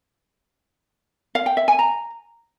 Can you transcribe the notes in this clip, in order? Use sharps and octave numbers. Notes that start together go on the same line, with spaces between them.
F5
G5
E5
G#5
A#5